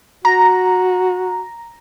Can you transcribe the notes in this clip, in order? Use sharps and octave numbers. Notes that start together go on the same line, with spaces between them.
F#4 A#5